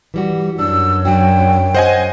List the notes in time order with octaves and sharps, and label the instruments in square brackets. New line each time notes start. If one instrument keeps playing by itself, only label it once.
[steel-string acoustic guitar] E3 G3 F#4
[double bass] F#2 [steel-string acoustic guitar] D4 [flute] E6
[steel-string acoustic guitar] F#3 D4 F#4 [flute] G5
[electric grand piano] C5 D#5 G#5 [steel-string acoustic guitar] F#5